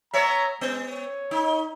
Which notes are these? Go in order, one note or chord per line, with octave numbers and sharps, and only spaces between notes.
B3 C#5 E5 A#5
G#3 B3
C#5
D#4